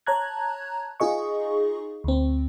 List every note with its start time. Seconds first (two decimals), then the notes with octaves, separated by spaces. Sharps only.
0.07 C#5 A5 A#5 F#6 G#6
1.00 D#4 F4 G#4 D#5 C#6
2.04 D2 C4